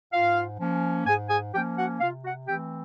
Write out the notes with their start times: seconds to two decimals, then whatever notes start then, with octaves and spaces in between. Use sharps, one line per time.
0.12 G#2 F4 F5
0.59 F3 A#3 C#4
1.06 G#2 G#4 G#5
1.30 G#4 G#5
1.53 F3 A#3 C#4 G4 G5
1.77 F#4 F#5
2.00 C3 F4 F5
2.24 F#4 F#5
2.47 E3 A3 C4 G4 G5